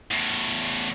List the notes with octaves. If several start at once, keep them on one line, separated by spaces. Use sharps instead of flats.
E2 A2